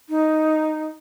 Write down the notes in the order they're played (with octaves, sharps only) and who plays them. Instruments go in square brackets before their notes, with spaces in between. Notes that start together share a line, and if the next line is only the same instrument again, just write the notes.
[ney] D#4